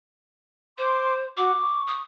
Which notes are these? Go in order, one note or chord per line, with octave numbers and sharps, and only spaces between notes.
C5 C6 D6
F#4 F#5 D6
C#6
D#6